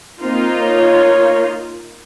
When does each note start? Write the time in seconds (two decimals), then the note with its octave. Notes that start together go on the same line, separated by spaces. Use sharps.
0.22 A#3 C4 D#4 F4
0.62 C#5